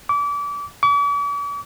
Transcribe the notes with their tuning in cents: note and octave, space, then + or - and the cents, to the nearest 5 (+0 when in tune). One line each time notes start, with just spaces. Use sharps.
D6 -30
D6 -45